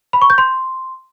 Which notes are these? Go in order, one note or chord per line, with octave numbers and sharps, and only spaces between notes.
B5
C#6
G6
C6